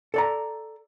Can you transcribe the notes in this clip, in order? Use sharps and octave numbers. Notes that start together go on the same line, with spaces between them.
A4 D5 A#5